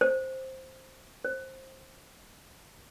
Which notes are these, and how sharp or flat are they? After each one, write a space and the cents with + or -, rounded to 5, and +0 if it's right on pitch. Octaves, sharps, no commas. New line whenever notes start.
C5 +5
C5 +20